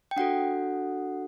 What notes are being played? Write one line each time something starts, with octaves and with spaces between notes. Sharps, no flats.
G5
D4 F#4 A4 F#5